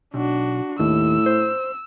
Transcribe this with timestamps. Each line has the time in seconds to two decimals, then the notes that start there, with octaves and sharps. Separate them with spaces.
0.14 B1 D4 F#4
0.79 D#2 A2 E6
1.26 C5